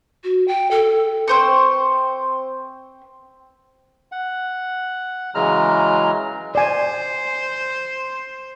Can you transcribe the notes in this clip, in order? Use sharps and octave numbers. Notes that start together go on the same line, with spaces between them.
F#4
G5
A4
C4 C5 C#6
F#5
C#3 E3 F#3 G#3 A#5 F6
C5 D5 G#5